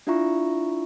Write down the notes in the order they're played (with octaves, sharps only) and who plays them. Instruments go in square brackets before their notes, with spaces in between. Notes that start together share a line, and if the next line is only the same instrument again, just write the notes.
[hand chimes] D4 E4 F4 E5 A#5 C#6